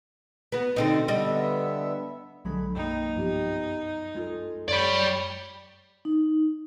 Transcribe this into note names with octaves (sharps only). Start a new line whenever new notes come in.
B3 F#4
B2 D3 C4 D#4
D3 G3 B3 D#5 E5
B1 D3 F#3 G#3 B5
B1 F#2 A#3 D#4 G5
G2 F3 B3 F4 G4
G#3 F4 A4
F#2 C#5 D5 B5 D#7
D#4